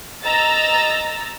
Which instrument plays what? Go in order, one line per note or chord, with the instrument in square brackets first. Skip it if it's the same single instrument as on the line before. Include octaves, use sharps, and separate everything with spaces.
[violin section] D#5 A#5 E6 A6